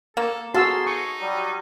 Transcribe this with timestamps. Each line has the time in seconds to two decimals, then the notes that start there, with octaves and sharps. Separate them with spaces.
0.17 A#3 A4
0.54 A#3 B3 F#4 G#4 A4 F5 C6 E6
0.87 D#4 C#6
1.20 F#3 G3